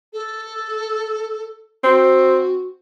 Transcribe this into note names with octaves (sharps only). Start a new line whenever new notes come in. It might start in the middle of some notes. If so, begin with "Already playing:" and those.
A4
C4 F#4